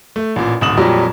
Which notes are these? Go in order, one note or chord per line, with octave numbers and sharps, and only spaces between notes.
A3
A1 A#2
D1 G#1 D#6 E7 F#7
F2 A#2 F#3 G3